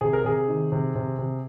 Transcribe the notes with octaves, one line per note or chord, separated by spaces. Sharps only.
C3 G#4
A#4
C3 G#4
D#3
C3
C3
C3